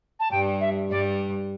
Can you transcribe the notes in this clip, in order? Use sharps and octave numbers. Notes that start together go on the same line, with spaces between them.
A5
G2 G3 G5
E5
G2 G3 D5